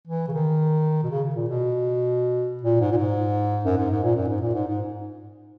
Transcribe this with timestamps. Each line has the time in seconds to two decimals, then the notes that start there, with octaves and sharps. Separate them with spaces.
0.07 E3
0.28 C#3
0.33 D#3
1.04 B2
1.10 C#3
1.35 A#2
1.49 B2
2.63 A#2
2.80 G#2
2.92 A#2
2.97 G#2
3.65 F#2
3.78 G#2
3.90 G#2
4.03 A#2
4.16 F#2
4.29 G#2
4.42 A#2
4.54 G#2
4.67 G#2